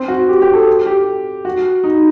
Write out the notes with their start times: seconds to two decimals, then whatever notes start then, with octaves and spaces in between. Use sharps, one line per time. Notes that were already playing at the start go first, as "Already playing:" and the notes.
Already playing: C4
0.08 F#4
0.28 G4
0.42 G4
0.54 A4
0.86 G4
1.45 F#4
1.84 D#4